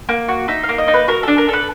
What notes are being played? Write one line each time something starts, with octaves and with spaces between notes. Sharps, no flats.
A#3
F#4
D#4 E5
F5
A#3
D#5
D#4
B4
F#4 A#4
D4 A4
A#4
A4 B4